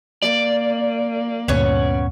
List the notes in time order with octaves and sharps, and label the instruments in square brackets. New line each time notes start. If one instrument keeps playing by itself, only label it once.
[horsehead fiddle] A#3 [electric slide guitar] D5
[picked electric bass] D2 G2 A#2 [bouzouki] B3 C#4 C#5